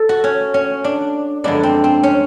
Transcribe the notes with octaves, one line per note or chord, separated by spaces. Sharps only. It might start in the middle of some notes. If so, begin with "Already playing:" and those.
Already playing: A4
F#4
C#4
C#4
D4
F#2 D3 F3 G#3 B3 D4
C4
C4
C#4